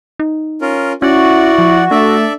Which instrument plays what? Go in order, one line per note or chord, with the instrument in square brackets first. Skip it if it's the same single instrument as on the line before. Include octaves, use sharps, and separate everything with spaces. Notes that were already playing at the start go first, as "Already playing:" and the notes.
[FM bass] D#4
[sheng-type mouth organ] C#4 F4 A#4
[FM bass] C#4 [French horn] E4 [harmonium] F#4 [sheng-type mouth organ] D5 F#5
[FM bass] F3
[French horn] A3 [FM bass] D4 [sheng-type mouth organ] A4 D5 E5